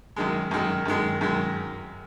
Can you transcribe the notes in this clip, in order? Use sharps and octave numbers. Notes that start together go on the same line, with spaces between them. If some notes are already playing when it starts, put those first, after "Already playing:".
F#2 D#3 G#3
F#2 D#3 G#3
F#2 D#3 G#3
F#2 D#3 G#3